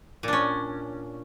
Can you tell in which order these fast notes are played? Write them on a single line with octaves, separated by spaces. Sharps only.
A#2 D4 C#4